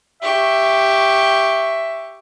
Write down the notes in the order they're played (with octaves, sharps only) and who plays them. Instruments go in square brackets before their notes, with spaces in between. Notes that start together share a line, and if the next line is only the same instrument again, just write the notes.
[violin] G4 C#6 [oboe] E5